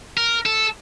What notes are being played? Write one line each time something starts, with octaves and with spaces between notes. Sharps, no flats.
A#4
A4